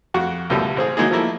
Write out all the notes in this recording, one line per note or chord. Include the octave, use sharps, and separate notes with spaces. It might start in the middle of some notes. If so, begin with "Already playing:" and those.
F2 F#4 C#6
C#2 F#2 B2 G3 A3 E5
A1 C4 G#4
D#3 F#3 G#3 A#3 D#4 G#4
F3 F#3 A3 A#3 E4